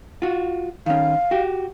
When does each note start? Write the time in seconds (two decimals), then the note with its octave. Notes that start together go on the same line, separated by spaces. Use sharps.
0.22 F4 F#4
0.86 D#3 C#4 F5
1.31 F#4 G4